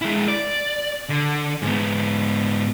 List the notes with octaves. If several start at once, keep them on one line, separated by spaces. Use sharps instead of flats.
G#3 E4
D5
D3
G#2 B3